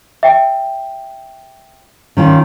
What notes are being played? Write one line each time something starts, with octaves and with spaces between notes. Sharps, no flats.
E5 G5
D#3 C#4 F4